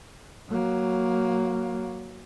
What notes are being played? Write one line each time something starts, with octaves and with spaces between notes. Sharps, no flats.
F#3 A#3